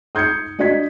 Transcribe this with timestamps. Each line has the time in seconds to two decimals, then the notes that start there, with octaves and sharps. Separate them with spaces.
0.15 D#6 G6 G#6 C7 C#7
0.59 D4 F#4 D5 D#5 G#6 B6